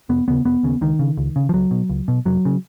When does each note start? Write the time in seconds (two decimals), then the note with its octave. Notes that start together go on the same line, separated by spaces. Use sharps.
0.09 F1 B3
0.28 D#2 C#3 B3
0.45 F1 B3
0.63 D#2 C#3
0.81 C#2 D#3
0.99 C#3
1.17 C#2
1.36 C#3
1.49 F3
1.53 C#2 F#3
1.71 B2
1.89 C#2
2.08 B2
2.25 F1 F#3
2.45 C#3